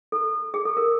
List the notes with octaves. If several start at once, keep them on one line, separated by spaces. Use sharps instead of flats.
A4
G#4
A4
A#4